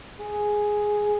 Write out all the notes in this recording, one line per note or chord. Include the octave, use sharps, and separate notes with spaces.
G#4